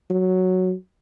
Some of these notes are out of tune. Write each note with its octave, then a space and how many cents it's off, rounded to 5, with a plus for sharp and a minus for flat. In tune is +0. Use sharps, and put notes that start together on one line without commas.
F#3 +0